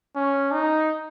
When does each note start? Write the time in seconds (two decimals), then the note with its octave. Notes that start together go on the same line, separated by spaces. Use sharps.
0.16 C#4
0.52 D#4